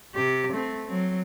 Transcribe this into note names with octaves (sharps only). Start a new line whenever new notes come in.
C3 G4
A3 C4
F#3 C4